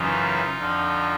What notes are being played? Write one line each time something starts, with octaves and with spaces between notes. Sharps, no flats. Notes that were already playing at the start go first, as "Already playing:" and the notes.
Already playing: F#2 C#3 E3 D#4 F4
F2 D3 F3